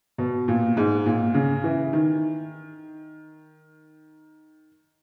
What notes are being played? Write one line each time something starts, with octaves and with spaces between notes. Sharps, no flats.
B2
A#2
G#2
A#2
C#3
E3
D#3